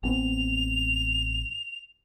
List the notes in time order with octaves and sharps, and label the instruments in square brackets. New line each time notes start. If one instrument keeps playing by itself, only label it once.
[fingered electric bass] A1 B3 C4 [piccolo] F7